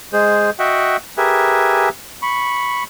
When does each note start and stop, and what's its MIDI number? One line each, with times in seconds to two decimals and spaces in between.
0.13 0.50 56
0.13 0.50 68
0.13 0.50 72
0.59 0.97 66
0.59 0.97 75
0.59 0.97 76
0.59 0.97 78
0.59 0.97 79
1.17 1.89 67
1.17 1.89 68
1.17 1.89 70
1.17 1.89 71
1.17 1.89 76
1.17 1.89 80
2.22 2.84 83
2.22 2.84 85